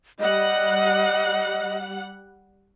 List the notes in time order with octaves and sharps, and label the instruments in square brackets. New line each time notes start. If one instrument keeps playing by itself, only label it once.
[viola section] G3 F#5 [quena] D#5